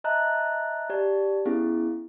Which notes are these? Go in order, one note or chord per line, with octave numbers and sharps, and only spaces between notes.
D#5 E5 A5 A#5 F#6
G4 D5 A5
B3 C#4 E4 G#4